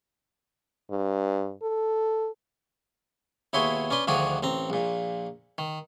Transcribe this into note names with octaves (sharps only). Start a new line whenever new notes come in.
G2
A4
D#2 B2 E4 G#4 C#5 C6
C#4 D4 B4 C6
D2 D#3 F3 D4 F#4 G#4
A1 C4 A#5
A#1 A#2
D#3